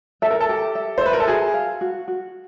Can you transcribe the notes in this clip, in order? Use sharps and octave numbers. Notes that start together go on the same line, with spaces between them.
A4 E5
A#4
A4
G4
E5
C5
B4 E5
A#4
A4
F#4 G#4
F5
F#4
F#4